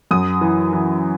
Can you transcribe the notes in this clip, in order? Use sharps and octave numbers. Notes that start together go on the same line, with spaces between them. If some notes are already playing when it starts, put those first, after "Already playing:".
F#2 D#6
E3
E3